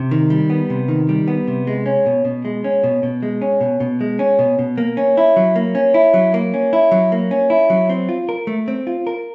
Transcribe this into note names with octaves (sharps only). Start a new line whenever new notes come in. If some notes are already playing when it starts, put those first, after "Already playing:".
Already playing: C3
D#3
G3
B3
C3
D#3
G3
B3
C3
G#3
C#4
B2
B2
G#3
C#4
B2
B2
G#3
C#4
B2
B2
G#3
C#4
B2
B2
A#3
C#4
E4
F#3
A#3
C#4
E4
F#3
A#3
C#4
E4
F#3
A#3
C#4
E4
F#3
C4
F4
A#4
A3
C4
F4
A#4